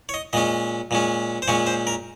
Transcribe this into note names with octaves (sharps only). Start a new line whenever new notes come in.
C#5
D#5
A#2 G#3 C#4 D#5
A#2 G#3 C#4
C5
A#2 G#3 C#4 C#5
C5
A#4